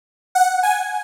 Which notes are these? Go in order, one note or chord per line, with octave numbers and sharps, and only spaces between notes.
F#5
G#5